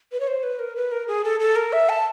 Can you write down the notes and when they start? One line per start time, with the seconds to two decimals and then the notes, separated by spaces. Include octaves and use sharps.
0.12 B4
0.20 C#5
0.28 C5
0.43 B4
0.59 A#4
0.76 B4
0.92 A#4
1.08 G#4
1.24 A4
1.40 A4
1.56 A#4
1.73 E5
1.89 A5